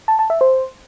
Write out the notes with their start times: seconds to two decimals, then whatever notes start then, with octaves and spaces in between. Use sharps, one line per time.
0.08 A5
0.19 A5
0.30 E5
0.41 C5